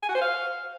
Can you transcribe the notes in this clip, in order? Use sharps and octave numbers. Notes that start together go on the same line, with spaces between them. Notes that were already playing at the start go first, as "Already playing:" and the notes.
G#5
F#4
C5
F5